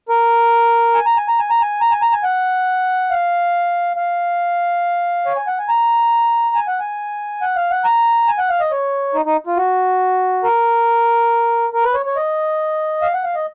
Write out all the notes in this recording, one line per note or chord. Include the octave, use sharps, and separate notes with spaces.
A#4
G#5
A#5
G#5
A#5
G#5
A#5
G#5
A#5
G#5
A#5
G#5
F#5
F5
F5
C#5
G#5
F#5
G#5
A#5
G#5
F#5
G#5
F#5
F5
F#5
A#5
G#5
F#5
F5
D#5
C#5
D#4
D#4
F4
F#4
A#4
A#4
B4
C#5
C#5
D#5
F5
F#5
F5
D#5